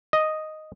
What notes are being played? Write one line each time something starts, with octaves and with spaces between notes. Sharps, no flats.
D#5